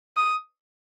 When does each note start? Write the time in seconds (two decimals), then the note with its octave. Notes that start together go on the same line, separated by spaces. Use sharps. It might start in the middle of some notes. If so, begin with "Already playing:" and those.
0.17 D#6